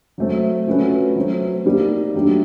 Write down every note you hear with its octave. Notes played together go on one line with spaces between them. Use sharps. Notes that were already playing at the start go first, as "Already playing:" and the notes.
F#3 A3 C4
F3 A3 C#4 F#4 B4
F#3 A3 C4
G3 A#3 D#4
F#3 A3 D4 G4